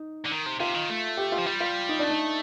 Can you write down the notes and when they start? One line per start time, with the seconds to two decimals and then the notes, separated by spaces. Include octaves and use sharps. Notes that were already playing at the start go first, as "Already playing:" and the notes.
Already playing: D#4
0.25 D3
0.32 D#3
0.46 C3
0.60 C3 F4
0.74 D#3
0.89 A3
1.17 G4
1.32 F4
1.38 F3
1.46 G3 F4
1.60 F4
1.89 D#4
1.99 A3 D4
2.09 D#4